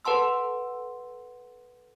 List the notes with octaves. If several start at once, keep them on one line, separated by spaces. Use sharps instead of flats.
A4 B4 F#5 A5 C6 E6